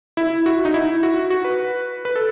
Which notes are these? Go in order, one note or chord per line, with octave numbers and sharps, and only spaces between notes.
E4
F#4
D#4
E4
F#4
F#4
B4
B4
A4